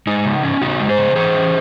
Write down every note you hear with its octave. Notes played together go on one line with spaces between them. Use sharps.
G#3 D#4
C#3
C#4
C#3 D#4 F#4
G#3
G#4 C5
C#3
E3 G#4 C5
C#4